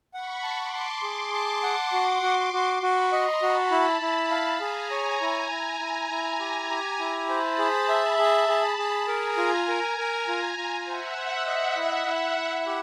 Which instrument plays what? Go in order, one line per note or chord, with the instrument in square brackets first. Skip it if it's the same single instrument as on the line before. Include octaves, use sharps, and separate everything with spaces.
[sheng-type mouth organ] F#5 [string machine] B5 C#6
[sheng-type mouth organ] A5
[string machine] C6 D6
[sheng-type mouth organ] A5
[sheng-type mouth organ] G#4 [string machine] C6 D6
[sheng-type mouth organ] A5
F#5
F#4
F#4
F#4
[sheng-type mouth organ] F#4 [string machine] B5 C#6
[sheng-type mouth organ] D#5 [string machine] A#5 C6
[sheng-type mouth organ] F#4 [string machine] A5 B5
[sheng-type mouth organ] E4
E4
F5
[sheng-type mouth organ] G#4 [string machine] G#5 A#5
[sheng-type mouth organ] C#5
E4
E4
E4
E4
G4
G4
E4
[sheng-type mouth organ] C5 [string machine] A5 B5
[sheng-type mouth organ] G#4
E5
G#4
G#4
G#4
[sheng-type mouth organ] A#4 [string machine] G#5 A#5
[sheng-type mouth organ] F4
A#4
A#4
F4
F4
[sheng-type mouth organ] C5 [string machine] E5 F#5
[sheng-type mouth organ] C5
D#5
E4
E4
E4
G4